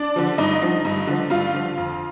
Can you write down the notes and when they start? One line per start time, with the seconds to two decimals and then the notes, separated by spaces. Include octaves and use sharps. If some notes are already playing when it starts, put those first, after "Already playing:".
Already playing: D4 D5
0.16 D3 F3
0.38 G2 D#4 D#5
0.62 D3 F3
0.85 G2
1.07 D3 F3
1.30 G2 F4 F5
1.54 D3 F3
1.77 F2